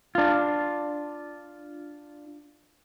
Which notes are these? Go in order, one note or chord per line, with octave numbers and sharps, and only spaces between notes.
D4 F4